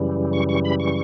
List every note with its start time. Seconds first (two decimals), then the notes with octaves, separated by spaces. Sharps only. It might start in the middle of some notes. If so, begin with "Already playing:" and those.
Already playing: F#2 C#3 E3 G3
0.33 C#6
0.49 C#6
0.65 B5
0.80 C#6